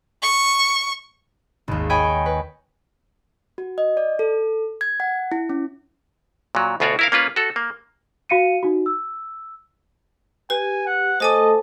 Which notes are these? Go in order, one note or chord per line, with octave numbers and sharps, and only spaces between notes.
C#6
G#1 D#2
C#5 D#5 G5 G#5 B5
B4
F#4
D#5
D5
A4
G#6
F#5
E4
C#4
A#2 F#3
D2 B2 F4 F#4 C#5 D5
E4 A#4 F5
A#3 C#4 F4 B4
F#4 A4
A#3
F#4 F5 C#7 D#7
D#4 F#4
E6
G4 B4 G#5
F#5
A3 A4 C5 D#5 G#5 A5 D6